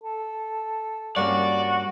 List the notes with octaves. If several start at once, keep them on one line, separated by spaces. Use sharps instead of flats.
A4
G2 A#3 C#4 F#4 D5